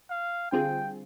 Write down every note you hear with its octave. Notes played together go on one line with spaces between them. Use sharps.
F5
D3 G3 C4 F4 G#4 G5